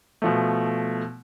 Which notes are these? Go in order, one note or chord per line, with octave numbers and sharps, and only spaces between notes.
B2 F3 A3